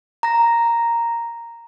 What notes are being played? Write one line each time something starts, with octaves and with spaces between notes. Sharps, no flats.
A#5 A#6